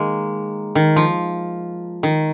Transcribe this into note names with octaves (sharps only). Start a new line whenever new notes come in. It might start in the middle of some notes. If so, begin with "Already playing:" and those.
Already playing: D#3 G#3 A#3
D#3
F3
D#3